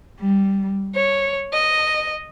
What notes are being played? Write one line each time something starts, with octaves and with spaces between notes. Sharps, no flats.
G3
C#5
D#5